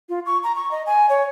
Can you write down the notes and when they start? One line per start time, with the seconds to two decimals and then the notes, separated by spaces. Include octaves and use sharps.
0.09 F4
0.26 C#6
0.44 A#5
0.56 C#6
0.71 D#5
0.86 G#5
1.09 C#5